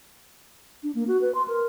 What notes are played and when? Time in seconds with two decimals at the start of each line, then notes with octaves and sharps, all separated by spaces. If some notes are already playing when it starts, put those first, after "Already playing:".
0.83 D4
0.95 A#3
1.08 F#4
1.21 B4
1.35 C6
1.48 A#4